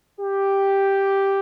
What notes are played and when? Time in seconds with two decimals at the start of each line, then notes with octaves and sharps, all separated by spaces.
0.20 G4